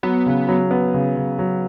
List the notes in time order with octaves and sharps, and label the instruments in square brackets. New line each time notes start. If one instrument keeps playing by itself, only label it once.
[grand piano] F#3 [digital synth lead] B3
[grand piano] C#3
F#3
B3
C#3
C#3
F#3